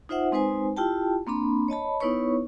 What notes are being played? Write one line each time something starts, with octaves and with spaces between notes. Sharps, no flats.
D#4 F4 C5 E5 F#5
G#3 C4 D#4 B4 C5 G#5
E4 F4 G4 G5 A5
A#3 C4 D4 B5
C#5 D#5 A5 B5
B3 D#4 E4 B4 C#5 C#6